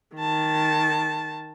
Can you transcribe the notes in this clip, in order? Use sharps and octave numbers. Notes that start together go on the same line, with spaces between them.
D#3 A5